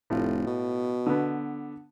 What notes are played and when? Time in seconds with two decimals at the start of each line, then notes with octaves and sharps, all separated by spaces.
0.10 F1 A2 F4
0.46 B2
1.06 D3 B3